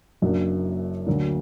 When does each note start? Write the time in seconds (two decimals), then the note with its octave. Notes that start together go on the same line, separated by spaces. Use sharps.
0.22 F#1 F#2 F#3 A#3 D4
1.06 D2 D3 F#3 A#3 D4